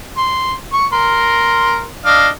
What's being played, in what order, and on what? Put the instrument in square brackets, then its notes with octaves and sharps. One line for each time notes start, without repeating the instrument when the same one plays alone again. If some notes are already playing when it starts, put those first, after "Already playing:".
[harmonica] C6
C#6
A#4 C6
D4 D#5 F5